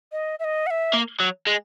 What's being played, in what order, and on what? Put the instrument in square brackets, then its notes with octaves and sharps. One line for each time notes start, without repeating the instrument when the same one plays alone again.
[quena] D#5
E5
D#5
F#5
E5
[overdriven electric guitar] A#3
F#3
G#3